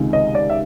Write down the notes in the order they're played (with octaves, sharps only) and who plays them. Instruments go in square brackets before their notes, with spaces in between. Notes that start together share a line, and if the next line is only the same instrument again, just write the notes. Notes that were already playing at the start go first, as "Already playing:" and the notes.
Already playing: [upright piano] C#2 C3 D#3 G#3
D#5
D5
E5